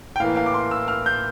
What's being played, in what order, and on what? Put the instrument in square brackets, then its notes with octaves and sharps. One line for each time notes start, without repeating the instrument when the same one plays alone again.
[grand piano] G5
A2 E3 A#3 F5
F5
D6
C6
E6
F6
G6